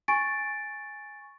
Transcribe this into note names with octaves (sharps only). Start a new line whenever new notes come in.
G#5 C#6 A6 D7